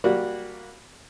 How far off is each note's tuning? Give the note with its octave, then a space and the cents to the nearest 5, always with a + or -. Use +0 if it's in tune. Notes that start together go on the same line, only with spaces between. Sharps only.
G3 +0 A#3 +0 F#4 -15